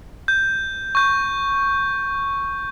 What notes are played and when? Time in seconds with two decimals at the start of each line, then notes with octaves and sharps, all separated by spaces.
0.28 G6
0.95 C#6 G6